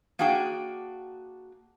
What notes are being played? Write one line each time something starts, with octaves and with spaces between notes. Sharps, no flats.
A#3 D4 F#4 G#4 G5